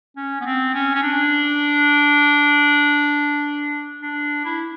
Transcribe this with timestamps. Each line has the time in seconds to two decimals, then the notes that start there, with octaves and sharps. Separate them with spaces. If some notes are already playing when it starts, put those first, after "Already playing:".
0.16 C#4
0.41 B3
0.45 C4
0.74 C#4
0.95 C#4
1.02 D4
4.02 D4
4.45 E4